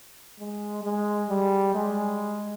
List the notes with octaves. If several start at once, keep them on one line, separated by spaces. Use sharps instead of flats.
G#3
G#3
G3
G#3